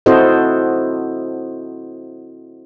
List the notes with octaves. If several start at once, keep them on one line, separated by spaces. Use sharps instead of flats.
C4 E4 F#4 A4 C5 D#5